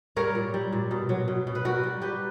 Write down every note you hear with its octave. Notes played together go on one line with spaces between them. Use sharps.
G3 A#4 C#5
A#2
G3
A#2
B2
F#3
B2
B2
B4
G3 F#4 A#4
G3
G3 G4 B4